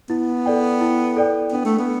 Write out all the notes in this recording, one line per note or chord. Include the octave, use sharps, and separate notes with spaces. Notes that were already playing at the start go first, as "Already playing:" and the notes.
B3 E4
A4 D5 G5
E4
A4 D5 G5
B3 D4
A3
B3